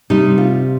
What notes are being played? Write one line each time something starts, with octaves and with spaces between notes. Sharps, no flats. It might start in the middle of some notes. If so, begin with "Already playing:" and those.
C3 G3 D#4
F4